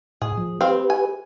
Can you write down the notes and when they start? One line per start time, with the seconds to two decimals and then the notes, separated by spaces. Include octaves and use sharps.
0.22 A2 G#4
0.38 F3
0.61 C4 G4 B4 F5
0.90 G#5